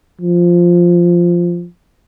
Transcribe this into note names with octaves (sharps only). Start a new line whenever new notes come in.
F3